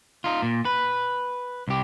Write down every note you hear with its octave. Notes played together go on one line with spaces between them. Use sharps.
D#4 F4
A#2
B4
C2 G4